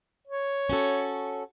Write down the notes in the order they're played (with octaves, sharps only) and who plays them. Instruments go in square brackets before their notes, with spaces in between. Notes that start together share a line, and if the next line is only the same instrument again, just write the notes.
[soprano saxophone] C#5
[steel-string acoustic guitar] C#4 F#4 A4